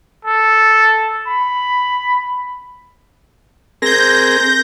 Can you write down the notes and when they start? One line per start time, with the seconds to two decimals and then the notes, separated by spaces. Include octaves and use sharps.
0.25 A4
1.27 B5
3.82 C4 G#4 A#4 G6 A#6